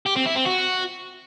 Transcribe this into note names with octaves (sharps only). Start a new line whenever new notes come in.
G4
C4
E4
C4
F#4